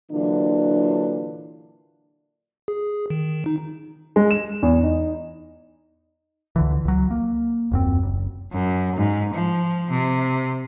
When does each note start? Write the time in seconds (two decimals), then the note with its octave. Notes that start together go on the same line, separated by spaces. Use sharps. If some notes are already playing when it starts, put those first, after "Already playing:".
0.12 A#2 D3 E3 F#3 D4
2.68 G#4
3.10 D#3
3.46 D#4
4.16 G#3
4.31 E7
4.62 E2
4.83 D#4
6.56 C#2 D3 E3
6.85 C#2 F#3
7.11 A#3
7.72 D#1 F#2 C4
8.03 F#1
8.52 F#2
8.96 G#2
9.34 F3
9.91 C3